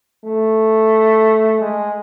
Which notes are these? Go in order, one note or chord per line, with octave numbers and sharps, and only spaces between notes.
A3
G#3